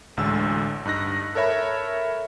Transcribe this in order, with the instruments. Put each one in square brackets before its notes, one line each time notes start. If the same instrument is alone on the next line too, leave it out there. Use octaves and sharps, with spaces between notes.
[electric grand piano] A1 D2 D3 G#3 E6
G2 D#4 F#6 A#6
A4 A#4 C#5 E5 B5